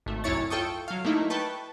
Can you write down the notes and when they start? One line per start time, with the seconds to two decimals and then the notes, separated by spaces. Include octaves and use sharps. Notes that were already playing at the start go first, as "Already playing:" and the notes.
0.06 G#1 A3
0.24 C2 F#2 E4 C#5 C#6 A6
0.50 F4 A4 G5 C#6 D#6
0.88 F#3 F5
1.05 A3 A#3 D#4 E4
1.30 B4 G5 A5 C#6